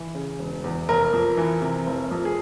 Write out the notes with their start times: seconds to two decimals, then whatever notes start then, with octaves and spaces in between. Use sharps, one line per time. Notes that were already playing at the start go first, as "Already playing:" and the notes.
Already playing: E3
0.15 C#3
0.39 E1
0.64 E2
0.89 F1 A#4
1.13 F2
1.37 E3
1.62 C3
1.87 F1
2.11 F2
2.25 G#4